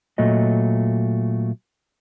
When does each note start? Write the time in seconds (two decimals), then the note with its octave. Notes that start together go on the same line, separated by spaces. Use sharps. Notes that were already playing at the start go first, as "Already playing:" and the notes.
0.18 A#2 F#3 A3 D#5